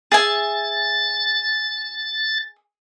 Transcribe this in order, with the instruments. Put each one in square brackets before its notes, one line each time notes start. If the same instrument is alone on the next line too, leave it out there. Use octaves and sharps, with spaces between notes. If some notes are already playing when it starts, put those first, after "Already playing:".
[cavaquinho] G#4 E5 G#5 [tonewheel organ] A6